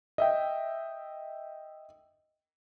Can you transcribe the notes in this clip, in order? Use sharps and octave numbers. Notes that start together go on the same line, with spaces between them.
D#5 E5 G5